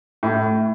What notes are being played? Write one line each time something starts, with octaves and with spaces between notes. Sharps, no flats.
A2